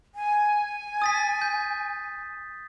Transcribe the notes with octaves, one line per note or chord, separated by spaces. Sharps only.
G#5
D#6 A6 B6
G6